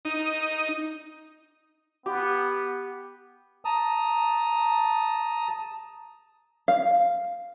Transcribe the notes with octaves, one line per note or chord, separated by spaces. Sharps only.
D#4
B3 G4
A5 A#5 D#6
F5